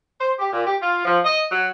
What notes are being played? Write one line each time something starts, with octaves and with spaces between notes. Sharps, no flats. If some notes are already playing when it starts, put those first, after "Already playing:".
C5
G4
A#2
G4
F4
F3
D#5
F#3